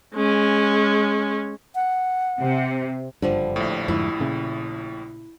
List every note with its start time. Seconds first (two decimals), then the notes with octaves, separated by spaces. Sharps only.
0.14 G#3 C#4
1.75 F#5
2.40 C3
3.22 F#1 G2 D3 F3 G3
3.56 A#1 A2 B5
3.88 F2 G#2 D3 E4
4.20 A#2 C#3